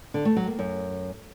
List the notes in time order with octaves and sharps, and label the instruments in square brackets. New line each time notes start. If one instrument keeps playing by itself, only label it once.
[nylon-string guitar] D3
A3
F#3
A#3
F#2